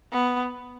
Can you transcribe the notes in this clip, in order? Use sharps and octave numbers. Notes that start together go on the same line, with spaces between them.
B3